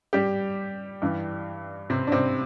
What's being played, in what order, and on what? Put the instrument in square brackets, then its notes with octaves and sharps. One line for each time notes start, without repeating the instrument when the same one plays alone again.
[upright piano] G3 G4
G2 E3
C3 C4
D4
C3 C4